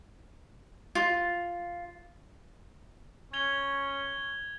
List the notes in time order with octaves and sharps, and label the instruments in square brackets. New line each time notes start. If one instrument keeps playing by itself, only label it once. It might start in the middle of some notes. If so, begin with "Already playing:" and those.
[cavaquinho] F4
[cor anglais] C#4 [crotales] G#6 F7 G7